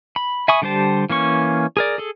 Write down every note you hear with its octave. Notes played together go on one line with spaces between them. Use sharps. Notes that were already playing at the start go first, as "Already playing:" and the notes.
B5
E5 G#5 B5 C#6 D#6
D3 G3 G4 C5 A5
E3 A#3 C#4 C#6
G#4 A#4 D5
G#4 A4